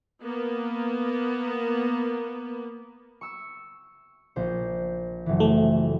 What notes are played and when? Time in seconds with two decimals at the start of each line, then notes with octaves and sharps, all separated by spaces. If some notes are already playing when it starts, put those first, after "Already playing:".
0.22 A#3 B3
3.21 C#6 E6
4.36 A#1 C5
5.26 F#1 E3
5.40 A3